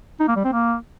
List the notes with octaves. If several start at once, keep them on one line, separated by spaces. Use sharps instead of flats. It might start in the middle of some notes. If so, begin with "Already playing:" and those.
D#4
A#3
G3
C4
A#3